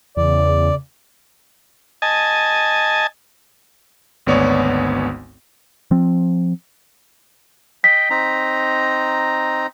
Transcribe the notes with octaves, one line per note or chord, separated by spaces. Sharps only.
E2 C#3 D5
D#5 G#5 A5
G#1 D2 B3 C#5 D5 C#6
F3 C4
D#5 G5 B6
C4 D#4 A#5